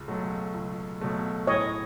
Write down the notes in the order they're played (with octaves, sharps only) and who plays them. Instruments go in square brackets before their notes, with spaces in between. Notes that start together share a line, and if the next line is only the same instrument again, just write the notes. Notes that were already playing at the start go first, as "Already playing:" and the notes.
Already playing: [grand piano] C#2
B2 F#3 A3
C#2
B2 F#3 A3
[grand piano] A2 [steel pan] C#5 D#5